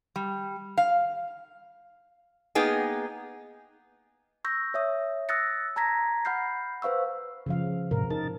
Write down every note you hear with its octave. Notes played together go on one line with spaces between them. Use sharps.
G3
F5
A#3 B3 D#4 G#4 G5
C#6 E6 G6 A#6
C#5 E5 D#6
D#6 E6 F#6 A6 A#6 C#7
A5 A#5 G#6 A#6 B6
F#5 B5 F6 G6 C7
B4 C5 F5 C#6 E6
C#3 F3 F5
G#2 C3 A#4
D#4 A#4 A5